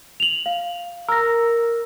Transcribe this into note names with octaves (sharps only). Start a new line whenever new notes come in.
F7 F#7
F5
A#4 E6 A#6